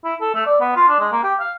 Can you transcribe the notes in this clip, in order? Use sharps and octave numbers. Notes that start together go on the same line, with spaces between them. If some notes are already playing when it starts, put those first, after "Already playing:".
E4
A4
A3
D5
B3
F4
D4
G#3
A#3
G4
F5